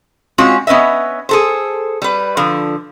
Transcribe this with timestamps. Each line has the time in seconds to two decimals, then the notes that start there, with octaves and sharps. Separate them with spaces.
0.38 G#3 C4 C#4 F4 F#4
0.67 B3 C#4 B4 D#5 E5
1.29 G#4 A4 C5
2.02 G3 B4
2.37 D3 F3